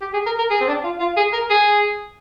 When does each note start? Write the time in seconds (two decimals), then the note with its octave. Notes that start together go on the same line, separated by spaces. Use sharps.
0.02 G4
0.13 G#4
0.26 A#4
0.38 A#4
0.51 G#4
0.61 C4
0.68 D4
0.84 F4
1.00 F4
1.17 G#4
1.33 A#4
1.50 G#4